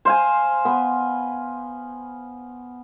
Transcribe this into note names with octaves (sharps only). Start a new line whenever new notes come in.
C5 F5 G#5
B3